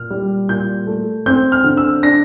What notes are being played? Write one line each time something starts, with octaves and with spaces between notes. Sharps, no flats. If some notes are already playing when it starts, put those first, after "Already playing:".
Already playing: A#2 F6
G3
A#2 G6
A3
C4 G6
F6
D3
E6
D4 A#6